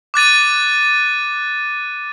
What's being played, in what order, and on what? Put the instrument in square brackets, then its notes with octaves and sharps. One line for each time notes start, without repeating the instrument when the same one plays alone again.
[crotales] D6 F#6 A6 D#7